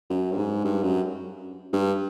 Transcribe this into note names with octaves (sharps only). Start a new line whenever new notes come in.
F#2
G2
G#2
G2
F#2
G2